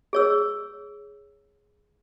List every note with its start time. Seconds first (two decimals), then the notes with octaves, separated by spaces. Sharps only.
0.13 G#4 C#5 E6